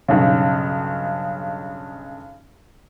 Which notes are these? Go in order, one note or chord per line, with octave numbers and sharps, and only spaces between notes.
B1 G2 C#3